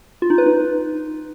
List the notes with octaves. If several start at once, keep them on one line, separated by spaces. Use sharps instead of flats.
F4
D#4
B4
D#4